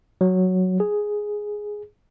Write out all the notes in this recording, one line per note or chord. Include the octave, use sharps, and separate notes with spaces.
F#3
G#4